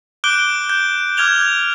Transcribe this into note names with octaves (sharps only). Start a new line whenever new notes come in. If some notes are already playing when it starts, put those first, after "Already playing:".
D6 F#6 G6 D7 G7
G6
D6 F6 G#6 F7 G7